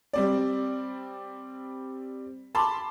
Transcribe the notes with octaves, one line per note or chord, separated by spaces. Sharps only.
G3 C4 D5
A5 B5 C6 D6